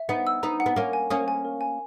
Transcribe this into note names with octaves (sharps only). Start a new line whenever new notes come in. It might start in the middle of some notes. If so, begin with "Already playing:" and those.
Already playing: E5
B3 D#4 F#5
E6
B3 D#4 A#5
F#5
B3
A#3 C#4 A#4
G#5
A#3 C#4 D#6
G#5
A#4
G#5